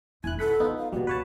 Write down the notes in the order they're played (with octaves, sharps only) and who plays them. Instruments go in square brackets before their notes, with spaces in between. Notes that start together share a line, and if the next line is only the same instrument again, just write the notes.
[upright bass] E1 E2 [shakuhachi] E4 [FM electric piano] G#5 F#6
[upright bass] D#2 [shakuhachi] A4 [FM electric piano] B4 F#5 B5
[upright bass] F#3 [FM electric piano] B3 D#4 F4
[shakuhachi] F5
[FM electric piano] B2 G3 [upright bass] A#3 B3 [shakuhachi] F#4
[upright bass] C#2 [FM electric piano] B4 C#5 A5